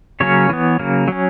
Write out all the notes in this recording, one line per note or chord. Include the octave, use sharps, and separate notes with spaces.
C#3 F#3 A#3 C#4 C#5
E3 B3
C#3 F#3 A#3
F#3 C#4